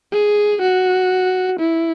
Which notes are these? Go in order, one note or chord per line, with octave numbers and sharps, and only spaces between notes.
G#4
F#4
E4